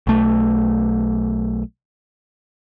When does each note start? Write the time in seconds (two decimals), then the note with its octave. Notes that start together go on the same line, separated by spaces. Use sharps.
0.07 B1 A3